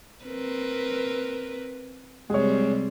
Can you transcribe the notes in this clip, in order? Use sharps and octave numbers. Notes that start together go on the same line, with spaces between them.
C4 A#4 B4
C3 G3 G#3 C4 C#5